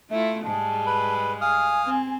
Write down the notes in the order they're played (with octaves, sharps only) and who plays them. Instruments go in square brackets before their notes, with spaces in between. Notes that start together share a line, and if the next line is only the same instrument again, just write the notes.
[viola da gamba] A3 E4 F4 [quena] E5
[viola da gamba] G#2 G3 G#3 [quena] A5
[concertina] B4 B5
[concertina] F5 D#6 F6 [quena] G#5
[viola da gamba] C4